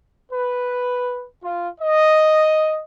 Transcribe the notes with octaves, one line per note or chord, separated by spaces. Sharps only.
B4
F4
D#5